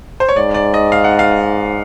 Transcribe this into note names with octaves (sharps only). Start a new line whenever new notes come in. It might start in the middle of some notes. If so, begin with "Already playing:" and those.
C5
C#5
G#2 D5
D5
D#5
F5
F#5
F5